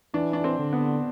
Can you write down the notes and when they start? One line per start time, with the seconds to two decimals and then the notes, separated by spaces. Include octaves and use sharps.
0.14 E3 D4
0.33 D4
0.44 C4
0.59 D3
0.73 B3